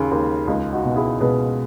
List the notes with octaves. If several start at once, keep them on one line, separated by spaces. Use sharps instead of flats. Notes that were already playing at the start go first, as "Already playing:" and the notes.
Already playing: D#2 C#3
D#2
C#2 D#4
D#4 F#4
B2
E4 G#4
B2 G#4 B4